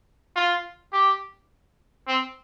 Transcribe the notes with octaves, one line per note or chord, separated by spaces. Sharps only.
F4
G4
C4